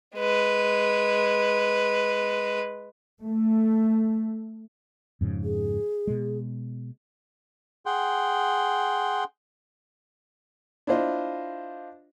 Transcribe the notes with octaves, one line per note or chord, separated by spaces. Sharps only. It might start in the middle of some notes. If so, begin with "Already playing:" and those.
G#3 B4
A3
F2 G#2 C#3
G#4
B2 G#3
G#4 F#5 G5 C6
D4 E4 F4 C5 D#5